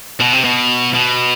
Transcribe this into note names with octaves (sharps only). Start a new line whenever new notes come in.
B2
C3
B2
B2